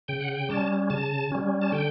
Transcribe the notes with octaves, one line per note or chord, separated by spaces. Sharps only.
C#3 G5
F#5
G5
G3 C#4 A5
C#3 A5
G3 C#4
A5
D3 G5